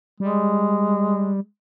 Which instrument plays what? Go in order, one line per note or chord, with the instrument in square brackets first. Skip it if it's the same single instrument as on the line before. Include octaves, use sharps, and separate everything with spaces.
[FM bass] G3 [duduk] G#3